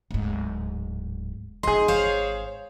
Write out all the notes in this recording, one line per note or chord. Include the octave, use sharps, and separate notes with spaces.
D1 G#2
G#1 D#4 G#4 D#5 C6
C5 C#5 F5